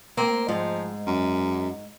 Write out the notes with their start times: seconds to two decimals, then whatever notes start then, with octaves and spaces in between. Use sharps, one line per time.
0.17 A#3 C4
0.48 G#2 F3
1.07 F#2